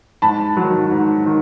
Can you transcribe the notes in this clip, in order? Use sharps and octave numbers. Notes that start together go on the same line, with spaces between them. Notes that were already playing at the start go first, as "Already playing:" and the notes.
G#2 A5 B5
F#3
D#3
G#2
D#3